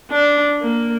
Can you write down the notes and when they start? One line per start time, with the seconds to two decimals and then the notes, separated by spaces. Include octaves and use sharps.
0.11 D4
0.61 A#3